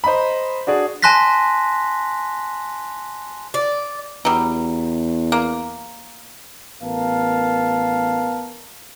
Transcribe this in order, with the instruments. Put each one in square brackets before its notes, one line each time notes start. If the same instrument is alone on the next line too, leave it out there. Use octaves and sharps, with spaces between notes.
[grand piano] C5 D#5 A#5 B5
D4 F#4 G#4 D5
[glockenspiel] G#5 A5 C6 F#6 A#6 B6
[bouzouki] D5
[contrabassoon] E2 [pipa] F#3 G3
[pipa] A#3
[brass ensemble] A1 B3 A#4 F5 A5